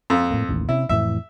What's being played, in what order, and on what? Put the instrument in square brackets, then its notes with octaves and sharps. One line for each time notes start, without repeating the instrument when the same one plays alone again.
[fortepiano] F2
[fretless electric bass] A2 A#3
A1 D#2
[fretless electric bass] C3 C#4 [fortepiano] E4
[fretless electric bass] F2 A2 E3 [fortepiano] E5